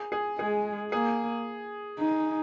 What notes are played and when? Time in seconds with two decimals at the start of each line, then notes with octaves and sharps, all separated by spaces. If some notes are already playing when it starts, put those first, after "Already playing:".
Already playing: G#4
0.12 G#4
0.39 G#3 G#4
0.92 A#3 G#4
1.99 D#4